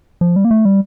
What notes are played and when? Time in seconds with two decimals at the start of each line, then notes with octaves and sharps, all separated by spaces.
0.21 F3
0.36 G3
0.45 A#3
0.51 A3
0.65 G3